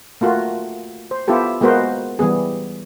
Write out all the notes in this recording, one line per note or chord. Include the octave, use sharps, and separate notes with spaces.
A3 A#3 F4 F#4
C5
B3 E4 F4 G4 A4
G#3 A#3 B3 F#4 A#4 C5
E3 G3 B3 G#4